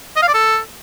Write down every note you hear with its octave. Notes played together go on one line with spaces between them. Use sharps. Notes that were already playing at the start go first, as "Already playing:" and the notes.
D#5
F5
D5
A4